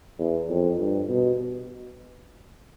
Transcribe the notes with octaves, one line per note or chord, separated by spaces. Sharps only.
E2
F2
G2
B2